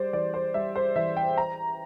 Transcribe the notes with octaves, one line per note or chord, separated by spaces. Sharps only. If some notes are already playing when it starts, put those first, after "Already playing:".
Already playing: G3 C5 D5
E3 D5
C5
G3 E5
C5
E3 E5
G5
A#5